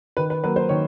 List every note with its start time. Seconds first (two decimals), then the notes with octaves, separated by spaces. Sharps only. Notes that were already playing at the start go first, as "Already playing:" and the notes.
0.17 D#3 B4
0.30 B4
0.43 F#3 A#3 B4
0.56 C5
0.69 D#3 C#5